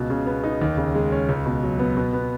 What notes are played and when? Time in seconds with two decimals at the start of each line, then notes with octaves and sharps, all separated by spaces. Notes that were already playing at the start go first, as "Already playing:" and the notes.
Already playing: C#2 B2
0.10 C#3
0.26 B3
0.44 D#4
0.61 D#2
0.77 C#3
0.95 G#3
1.12 C#4
1.28 C#2
1.46 B2
1.63 F#3
1.79 B3
1.97 B2
2.13 B3